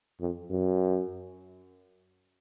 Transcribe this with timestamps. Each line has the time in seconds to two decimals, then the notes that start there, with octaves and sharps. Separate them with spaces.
0.20 F2
0.50 F#2